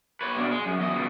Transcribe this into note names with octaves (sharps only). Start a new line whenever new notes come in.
B4 C#5
B2 D4
G#3
F#2
E2 D#5
C#2 B2